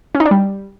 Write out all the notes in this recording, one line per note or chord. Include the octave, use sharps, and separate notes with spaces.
C#4
D#4
D4
G3